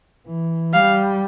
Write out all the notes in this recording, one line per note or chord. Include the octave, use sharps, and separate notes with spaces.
E3
G3 F5